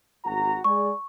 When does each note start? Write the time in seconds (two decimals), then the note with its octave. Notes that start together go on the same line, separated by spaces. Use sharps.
0.24 G#1 F#4 A#5
0.64 G#3 G#4 D5 C#6